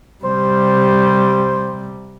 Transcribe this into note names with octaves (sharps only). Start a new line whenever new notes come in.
C3 G3 C5